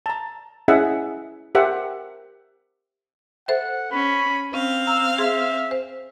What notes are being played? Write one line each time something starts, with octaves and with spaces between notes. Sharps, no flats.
A5 A#5
C#4 E4 G#4 D#5 E5 F#5
G4 A#4 C5 E5 F#5
A4 C5 E5 F#5
C#4 B5
C4 C#4 F5
A#5 E6
G#4 E5 C6
C5